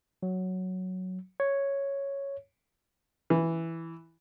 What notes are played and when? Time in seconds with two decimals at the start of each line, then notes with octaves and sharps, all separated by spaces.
0.23 F#3
1.40 C#5
3.30 E3